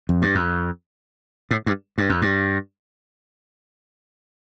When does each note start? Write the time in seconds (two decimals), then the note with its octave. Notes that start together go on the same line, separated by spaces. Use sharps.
0.09 F2
0.22 G2
0.35 F2
1.51 A2
1.66 G2
1.98 G2
2.09 F2
2.22 G2